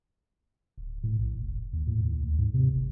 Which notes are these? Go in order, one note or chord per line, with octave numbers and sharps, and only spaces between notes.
D1
A2
A#1
F1
D#2
A2
D#2
D2
G#2
C3
G1